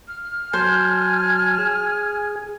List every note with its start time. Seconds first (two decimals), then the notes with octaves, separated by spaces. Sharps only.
0.08 F6
0.53 F#3 C5 G#5 A5
1.59 G#4